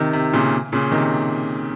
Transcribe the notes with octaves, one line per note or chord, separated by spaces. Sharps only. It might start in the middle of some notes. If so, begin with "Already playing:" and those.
Already playing: C3 D#3
C3
A#2 C#3
A#2 C#3
C3 D#3